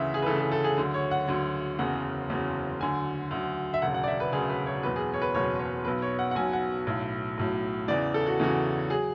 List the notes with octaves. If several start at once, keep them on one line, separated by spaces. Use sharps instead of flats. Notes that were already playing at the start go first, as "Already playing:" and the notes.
Already playing: D2 C#3 E3 E5
G#4
B4
D2 C#3 E3 A4
G#4
A4
G#4
D2 D3 F#3
C#5
F#5
D2 D3 F#3
F#1 E2 C#3 F#3 F#5
F#1 E2 C#3 F#3
D2 D3 F#3 G#5
D2 D3 F#3
E5
E1 D2 C#3 F#3 F#5
F#5
D5
E5
B4
E1 D2 C#3 F#3 G#4
B4
C#5
F#1 E2 B2 F#3 B4
G#4
C#5
B4
F#1 E2 B2 F#3 C#5
C#5
B1 B2 F#3 B4
C#5
F#5
F#5
B1 B2 F#3 G#5
F#5
B1 A2 F#3
B1 A2 F#3
E2 C#3 E3 D5
A4
F#4
E2 C#3 E3 F#4
F#3 G#4